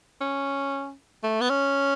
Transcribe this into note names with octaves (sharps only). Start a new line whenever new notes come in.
C#4
A3
B3
C#4